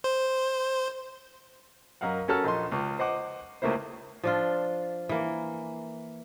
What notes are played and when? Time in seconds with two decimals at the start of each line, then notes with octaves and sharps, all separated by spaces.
0.04 C5
2.01 F#2 A#4 D#5 F5 F#5
2.28 C#4 F#4 A4 A#4 A5 F6
2.44 A#1 D#5 C6
2.72 C#2
2.99 C5 D#5 F#5 D6
3.62 C#2 A3 A#3 E4 C5
4.23 F3 D4 F4
5.09 E3 A#3